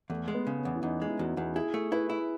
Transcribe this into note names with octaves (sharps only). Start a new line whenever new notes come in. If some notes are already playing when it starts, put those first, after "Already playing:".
E2 A3
G#3
B3
C#3
C#4
E2
E4
E2 D#4
G#3
E4
E2 F#4
E2
E4 G#4
A3
E4 B4
E4